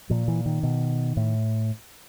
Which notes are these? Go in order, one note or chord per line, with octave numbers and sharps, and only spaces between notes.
A#2 F3
E3
D#3
B2
A2